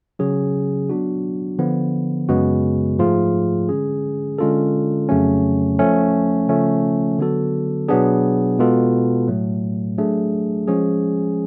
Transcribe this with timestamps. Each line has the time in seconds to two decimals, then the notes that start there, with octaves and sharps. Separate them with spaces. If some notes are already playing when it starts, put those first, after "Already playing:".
0.19 C#3 F#3 C#4 G#4
0.90 F#3 B3 D4 F#4
1.59 D3 F3 B3
2.29 F#2 C#3 G#3 B3 F#4
2.99 G#2 F3 A3 F4 G#4
3.69 D3 G#3 C#4 G#4
4.38 D3 G#3 C#4 F4 A4
5.09 F2 C#3 F#3 A3 C#4
5.79 F3 A3 C#4
6.48 C#3 F3 A3 C#4 F4
7.19 D3 F#3 B3 F#4 A4
7.88 B2 F#3 B3 D4 G#4
8.59 B2 G#3 B3 F4 A4
9.28 A2 F#3 A3
9.98 F#3 A3 D4 G#4
10.67 F3 G#3 C#4 G#4